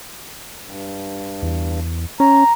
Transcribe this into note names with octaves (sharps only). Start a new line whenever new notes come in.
G2
E2
C#4 A#5